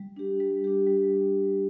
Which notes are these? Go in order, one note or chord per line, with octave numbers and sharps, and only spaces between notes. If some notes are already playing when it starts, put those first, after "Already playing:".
Already playing: G3
D4 G4
G3
D4 G4
G3